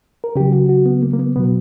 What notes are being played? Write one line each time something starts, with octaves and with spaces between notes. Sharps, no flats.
A#4
C#3 F#3 G4
F#4
F#4
B3
A#3
A#3
B3
B2 F#3 B3